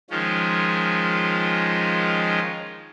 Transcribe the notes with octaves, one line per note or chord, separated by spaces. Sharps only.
D#3 F3 G#3 C#4 F4